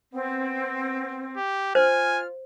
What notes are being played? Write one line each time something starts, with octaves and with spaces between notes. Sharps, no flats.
B3 C4
G4
F4 C5 G#5 F6